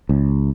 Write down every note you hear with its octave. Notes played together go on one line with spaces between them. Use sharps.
C#2